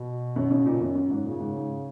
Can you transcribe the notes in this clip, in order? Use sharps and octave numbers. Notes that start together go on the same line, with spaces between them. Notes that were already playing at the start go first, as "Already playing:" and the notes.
Already playing: B2
F#2
C#3
A#2
F#2
F#2
G#2
A#2 C#3
G#2
G#2